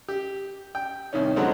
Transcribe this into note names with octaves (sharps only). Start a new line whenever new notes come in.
G4
G5
C2 D#3 C#4
D3 F3 F#3 G#3 B3 C4